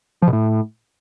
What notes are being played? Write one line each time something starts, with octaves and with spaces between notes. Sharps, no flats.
F3
B2
A2